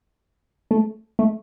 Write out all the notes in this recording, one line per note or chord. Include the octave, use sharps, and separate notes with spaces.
A3
A3